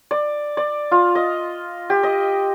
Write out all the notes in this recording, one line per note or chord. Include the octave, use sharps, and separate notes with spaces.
D5
D5
F4
D#5
G4
D#5